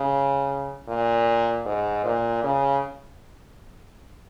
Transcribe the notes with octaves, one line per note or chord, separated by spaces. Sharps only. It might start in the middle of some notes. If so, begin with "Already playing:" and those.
Already playing: C#3
A#2
G#2
A#2
C#3